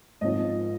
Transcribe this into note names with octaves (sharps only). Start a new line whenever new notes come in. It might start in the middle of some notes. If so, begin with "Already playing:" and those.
G#1 G#2 F3 D#5